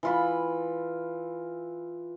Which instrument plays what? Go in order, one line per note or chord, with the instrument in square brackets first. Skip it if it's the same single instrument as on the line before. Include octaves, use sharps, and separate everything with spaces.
[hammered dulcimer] E3 F4 B5